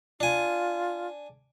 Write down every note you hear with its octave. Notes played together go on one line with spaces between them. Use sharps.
D4 F4 G#5